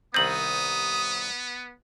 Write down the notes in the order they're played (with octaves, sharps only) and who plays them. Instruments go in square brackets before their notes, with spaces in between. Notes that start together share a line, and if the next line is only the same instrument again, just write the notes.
[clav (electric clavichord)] C2 D#3 C4 [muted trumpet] B3 [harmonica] D#6 [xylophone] G6 F#7